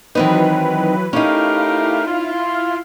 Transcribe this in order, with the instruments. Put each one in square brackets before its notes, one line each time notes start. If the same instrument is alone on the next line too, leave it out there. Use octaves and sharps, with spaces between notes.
[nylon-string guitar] D#3 C4 D#4 [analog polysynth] E3 F#3 B4
[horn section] A3 G4 A#4 [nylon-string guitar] C#4 D#4 [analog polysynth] E4 F5
[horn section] F4